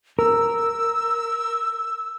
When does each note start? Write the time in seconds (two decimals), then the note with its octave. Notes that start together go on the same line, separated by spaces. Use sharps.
0.19 A#4 E6